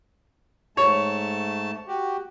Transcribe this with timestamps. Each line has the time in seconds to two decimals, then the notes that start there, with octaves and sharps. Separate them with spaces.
0.77 G#2 A3 C#5 A5
1.88 F#4 G4